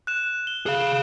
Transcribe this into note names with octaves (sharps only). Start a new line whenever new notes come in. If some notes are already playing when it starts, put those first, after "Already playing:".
F#6 E7
G7
G#4 F5 F#6 G7